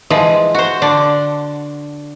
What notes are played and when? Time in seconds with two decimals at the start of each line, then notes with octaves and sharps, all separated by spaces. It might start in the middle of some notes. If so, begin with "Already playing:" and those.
0.10 E3 F3 G#3
0.54 F#4 C5
0.82 D3 D4